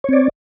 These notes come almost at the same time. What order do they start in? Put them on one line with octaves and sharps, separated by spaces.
C#5 C4 D5